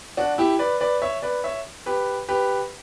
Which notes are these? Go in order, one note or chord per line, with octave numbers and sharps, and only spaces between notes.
D4 F#4
E4 G4
B4 D5
B4 D5
C#5 E5
B4 D5
C#5 E5
G4 B4
G4 B4